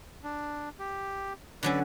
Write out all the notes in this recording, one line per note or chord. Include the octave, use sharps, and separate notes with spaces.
D4
G4
D3 F#3 C#4 B4 D5